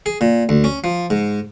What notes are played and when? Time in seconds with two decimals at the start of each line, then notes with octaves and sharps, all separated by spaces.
0.06 G#4
0.21 A#2
0.49 D2
0.64 C#4
0.84 F3
1.10 G#2